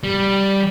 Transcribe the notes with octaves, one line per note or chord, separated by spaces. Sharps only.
G3